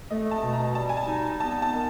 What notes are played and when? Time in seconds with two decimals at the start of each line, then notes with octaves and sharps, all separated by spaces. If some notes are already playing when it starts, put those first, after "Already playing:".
0.10 A3 D#5
0.31 A5
0.42 B2
0.53 A#5
0.75 G3 A5
0.89 G#5
0.97 A5
1.07 D#4
1.40 B3 A5
1.62 A5
1.72 D#3